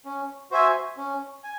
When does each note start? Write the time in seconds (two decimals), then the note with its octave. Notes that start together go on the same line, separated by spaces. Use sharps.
0.05 C#4
0.51 F#4 C5 E5 G#5
0.97 C#4
1.44 G#5